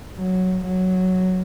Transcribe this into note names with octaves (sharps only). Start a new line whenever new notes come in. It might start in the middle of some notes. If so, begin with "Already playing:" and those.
F#3
F#3